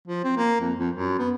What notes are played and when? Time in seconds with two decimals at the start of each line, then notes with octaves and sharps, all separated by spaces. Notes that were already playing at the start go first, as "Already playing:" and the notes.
0.08 F3
0.24 C4
0.37 A#3
0.60 F2
0.79 F2
0.94 F#2
1.19 B3